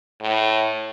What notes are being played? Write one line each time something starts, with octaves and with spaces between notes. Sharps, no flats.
A2